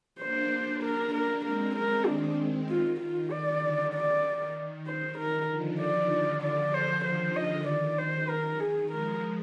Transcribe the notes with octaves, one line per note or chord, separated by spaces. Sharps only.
A#3 D4 C5
A#4
A#4
G#3 C4 A#4
A#4
D#3 D4
F4
F4
D#3 D5
D3
D#3 D5
C5
D#3 A#4
D3 F3
D5
D5
C5
D#3 C5
D#5
D5
C5
D#3 A#4
G#4
F3 G#3 A#4